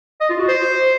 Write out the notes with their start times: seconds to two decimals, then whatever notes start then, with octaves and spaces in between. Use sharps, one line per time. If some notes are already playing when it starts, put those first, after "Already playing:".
0.21 D#5
0.30 F4
0.39 F#4
0.48 C5